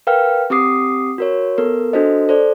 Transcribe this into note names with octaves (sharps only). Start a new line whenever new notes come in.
A#4 B4 F5 G5 F6
C4 G4 D6 D#6 C7
F#4 A#4 C#5
B3 A4 A#4
D4 F#4 A4 C5 D#5
A4 C5 D5